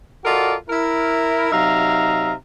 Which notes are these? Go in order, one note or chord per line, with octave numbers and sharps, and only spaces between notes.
F4 F#4 A4 A#4 D5 D#5
E4 A#4
C3 F#3 D#4 E5 F5 A#5